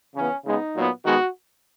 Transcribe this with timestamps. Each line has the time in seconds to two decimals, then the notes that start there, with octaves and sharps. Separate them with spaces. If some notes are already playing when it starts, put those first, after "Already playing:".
0.15 C#3 E3 B3 C#4
0.45 C#3 G#3 B3 D#4
0.75 A#2 F#3 B3
1.04 D#3 G#3 B3 F#4